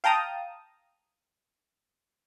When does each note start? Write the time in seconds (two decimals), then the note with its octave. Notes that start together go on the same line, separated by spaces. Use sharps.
0.04 F5 G5 A5 A#5 D#6